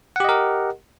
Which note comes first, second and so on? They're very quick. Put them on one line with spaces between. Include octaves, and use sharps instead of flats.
F#5 G4 D#5 A#4